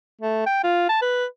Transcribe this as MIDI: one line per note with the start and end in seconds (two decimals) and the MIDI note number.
0.21 0.45 57
0.46 0.59 79
0.64 0.89 65
0.89 1.00 81
1.02 1.25 71